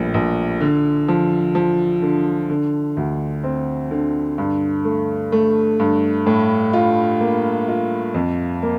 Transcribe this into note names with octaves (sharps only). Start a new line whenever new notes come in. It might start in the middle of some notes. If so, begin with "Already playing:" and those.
Already playing: A#1 A2 G3
A#1
D3
F3
F3
D3
D3
D2
C4
D3
G2
A3
A3
G2
A2
F4
A#3
F4
F2
A#3